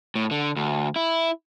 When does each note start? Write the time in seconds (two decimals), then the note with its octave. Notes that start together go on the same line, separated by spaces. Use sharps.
0.15 A2
0.31 D3
0.56 D2
0.96 E4